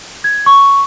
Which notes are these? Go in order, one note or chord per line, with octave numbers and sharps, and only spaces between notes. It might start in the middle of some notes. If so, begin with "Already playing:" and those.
G#6
C#6